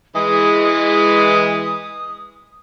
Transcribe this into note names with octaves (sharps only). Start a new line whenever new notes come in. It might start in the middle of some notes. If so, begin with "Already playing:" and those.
E3 G#3 D#6